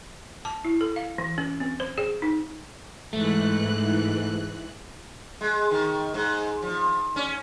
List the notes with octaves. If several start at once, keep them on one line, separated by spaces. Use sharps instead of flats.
A5
E4
A4
F5
E3
C#4
C4
C5
G#4
D#4
G#2 E3 A3 F#6
G#3
D#3
G#2
F3
C#4